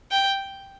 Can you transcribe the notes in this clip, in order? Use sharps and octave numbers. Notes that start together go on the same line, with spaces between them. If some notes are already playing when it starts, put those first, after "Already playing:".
G5